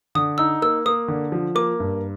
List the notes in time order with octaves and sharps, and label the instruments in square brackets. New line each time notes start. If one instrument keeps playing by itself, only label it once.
[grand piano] D3 [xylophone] D#6
[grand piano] D#4 [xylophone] E6
[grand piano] A#3 [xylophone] E6
[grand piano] A#3 [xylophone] D#6
[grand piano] D3
F3
[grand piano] A#3 [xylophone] D6
[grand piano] G2